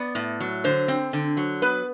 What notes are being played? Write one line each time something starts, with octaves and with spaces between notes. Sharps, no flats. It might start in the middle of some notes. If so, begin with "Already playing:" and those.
Already playing: B3 D5
A2
F#3
D3 C5
C4
D3
F#3
B3 B4